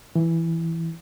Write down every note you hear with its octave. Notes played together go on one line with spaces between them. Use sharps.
E3